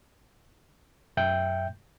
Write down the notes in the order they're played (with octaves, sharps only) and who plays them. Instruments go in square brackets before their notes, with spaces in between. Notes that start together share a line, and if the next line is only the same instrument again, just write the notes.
[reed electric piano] F#2 E5 G5 G6